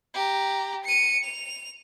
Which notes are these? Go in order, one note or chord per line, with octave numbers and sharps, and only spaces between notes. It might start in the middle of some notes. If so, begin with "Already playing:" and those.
G4 A#5
C#7 D#7
F7